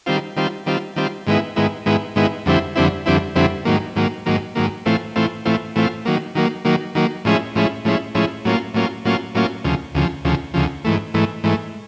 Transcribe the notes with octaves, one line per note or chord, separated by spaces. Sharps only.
D#3 G3 C4 F4
D#3 G3 C4 F4
D#3 G3 C4 F4
D#3 G3 C4 F4
G#2 D#3 G#3 B3 E4
G#2 D#3 G#3 B3 E4
G#2 D#3 G#3 B3 E4
G#2 D#3 G#3 B3 E4
F2 D3 G3 C4 E4
F2 D3 G3 C4 E4
F2 D3 G3 C4 E4
F2 D3 G3 C4 E4
G#2 D#3 F#3 A#3
G#2 D#3 F#3 A#3
G#2 D#3 F#3 A#3
G#2 D#3 F#3 A#3
A2 E3 A3 C4 F4
A2 E3 A3 C4 F4
A2 E3 A3 C4 F4
A2 E3 A3 C4 F4
D#3 F#3 A#3
D#3 F#3 A#3
D#3 F#3 A#3
D#3 F#3 A#3
A2 F3 G#3 C#4 E4
A2 F3 G#3 C#4 E4
A2 F3 G#3 C#4 E4
A2 F3 G#3 C#4 E4
A2 F#3 A#3 C#4 F4
A2 F#3 A#3 C#4 F4
A2 F#3 A#3 C#4 F4
A2 F#3 A#3 C#4 F4
D2 C#3 F3
D2 C#3 F3
D2 C#3 F3
D2 C#3 F3
G#2 E3 A3
G#2 E3 A3
G#2 E3 A3